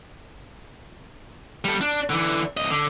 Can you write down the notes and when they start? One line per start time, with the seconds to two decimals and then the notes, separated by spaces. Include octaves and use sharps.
1.65 G3 A4
1.81 D4
2.10 D3 E3
2.57 C2 D#5
2.70 D3